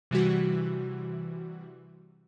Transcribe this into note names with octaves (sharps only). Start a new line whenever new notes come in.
C3 E3 G3 F#4